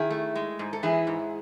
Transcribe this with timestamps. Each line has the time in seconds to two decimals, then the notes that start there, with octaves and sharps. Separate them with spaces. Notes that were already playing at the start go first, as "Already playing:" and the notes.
Already playing: D#3 E4 G#4
0.11 A3
0.36 G#3
0.59 G#2
0.73 A4
0.83 E3 E4 G#4
1.07 G#2